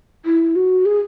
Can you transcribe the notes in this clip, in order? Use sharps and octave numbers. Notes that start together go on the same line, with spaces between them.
E4
F#4
G#4